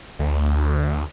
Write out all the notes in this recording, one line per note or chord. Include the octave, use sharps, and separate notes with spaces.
D2